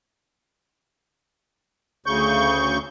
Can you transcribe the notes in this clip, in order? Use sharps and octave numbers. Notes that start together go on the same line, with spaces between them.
D2 C#3 C#6 G6